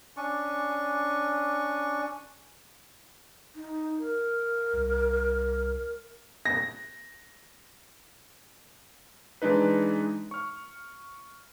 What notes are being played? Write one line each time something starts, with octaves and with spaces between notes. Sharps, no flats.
C#4 D4 C#6
D#4
A#4
C2
A#6
E3 G#3 D4 D#4 B4
C#6 F6